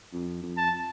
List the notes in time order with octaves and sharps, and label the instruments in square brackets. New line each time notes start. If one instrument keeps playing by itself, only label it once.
[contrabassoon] F2
F2
[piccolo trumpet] A5